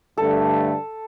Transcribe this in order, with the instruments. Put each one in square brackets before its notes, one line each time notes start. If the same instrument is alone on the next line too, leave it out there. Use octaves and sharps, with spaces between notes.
[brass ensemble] G2 D3 A3 [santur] A4